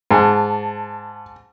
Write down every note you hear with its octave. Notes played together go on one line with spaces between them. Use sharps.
G#2 A5